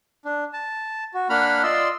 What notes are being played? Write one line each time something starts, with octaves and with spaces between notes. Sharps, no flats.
D4
A5
F#4
A#3 D4 F#5 B5 F6
F4 D5 D#5 C6 E6